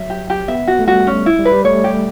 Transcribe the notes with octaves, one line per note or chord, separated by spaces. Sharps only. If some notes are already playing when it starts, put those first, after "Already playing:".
Already playing: F#3 E5
G4
G4
B3 E5
F#4
A3
G3 F#4
C#4
E4
G3
B4
G3
A3 C#5
G4